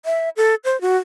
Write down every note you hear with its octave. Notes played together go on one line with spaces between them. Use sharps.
E5
A4
C5
F#4